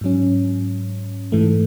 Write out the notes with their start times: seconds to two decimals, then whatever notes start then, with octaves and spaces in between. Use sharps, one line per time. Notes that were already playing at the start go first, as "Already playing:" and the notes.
0.01 G#2 F#3 C#4
1.32 G#2 E3 A3